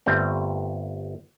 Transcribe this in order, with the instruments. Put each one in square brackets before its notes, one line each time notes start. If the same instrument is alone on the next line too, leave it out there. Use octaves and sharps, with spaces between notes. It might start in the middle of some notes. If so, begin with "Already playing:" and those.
[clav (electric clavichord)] G1 G3 A3 C4